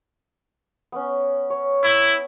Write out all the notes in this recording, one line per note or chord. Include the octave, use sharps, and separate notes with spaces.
B3 C#4
C#5
E4